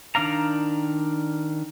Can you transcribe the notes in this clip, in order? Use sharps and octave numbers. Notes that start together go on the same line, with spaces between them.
D#3 D4 D5 F5 A#5